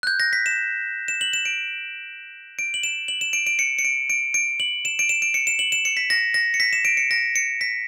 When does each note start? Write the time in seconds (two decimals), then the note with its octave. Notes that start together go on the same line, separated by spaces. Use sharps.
0.03 F#6
0.07 G6
0.20 A#6
0.33 B6
0.46 E7
1.08 E7
1.21 F#7
1.33 E7
1.45 D7
2.59 D7
2.74 F#7
2.83 E7
3.08 F#7
3.21 E7
3.33 D7
3.47 D7
3.59 C#7
3.79 C#7
3.85 D7
4.10 D7
4.34 D7
4.60 F#7
4.85 E7
4.99 D7
5.09 E7
5.22 D7
5.34 C#7
5.47 E7
5.59 F#7
5.72 E7
5.85 C#7
5.97 B6
6.10 A#6
6.34 A#6
6.54 C#7
6.60 B6
6.73 E7
6.85 D7
6.97 C#7
7.11 A#6
7.36 C#7
7.61 B6